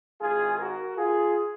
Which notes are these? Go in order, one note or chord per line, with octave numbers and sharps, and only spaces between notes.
G#1 G#2 D#3 G#3 F4 G#4
F#4 A#4
F4 G#4